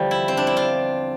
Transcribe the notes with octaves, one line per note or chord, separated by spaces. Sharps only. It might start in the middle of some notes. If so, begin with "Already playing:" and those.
Already playing: E2 D3 F3 G3
E4
C4
D4
E4
F4